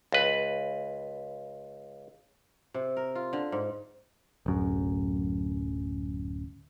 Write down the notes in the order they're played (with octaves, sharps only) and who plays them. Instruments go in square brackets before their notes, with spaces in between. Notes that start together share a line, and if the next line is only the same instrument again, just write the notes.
[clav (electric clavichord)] C#2 B4
[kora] C3
A#4
F4
D3
G#2
[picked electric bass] D1 F#2